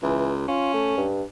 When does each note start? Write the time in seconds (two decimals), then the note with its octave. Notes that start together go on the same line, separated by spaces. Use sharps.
0.03 C#2 E3
0.48 C#4 F4
0.74 A3
0.97 G2